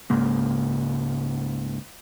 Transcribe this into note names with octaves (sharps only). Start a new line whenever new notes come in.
C#2 G#2 C#3 A#3